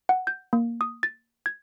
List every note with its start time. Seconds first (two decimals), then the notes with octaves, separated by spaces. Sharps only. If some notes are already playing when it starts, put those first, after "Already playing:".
0.09 F#5
0.27 G6
0.53 A#3
0.81 D#6
1.03 A6
1.46 G#6